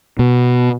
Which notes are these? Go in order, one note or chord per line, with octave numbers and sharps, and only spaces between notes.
B2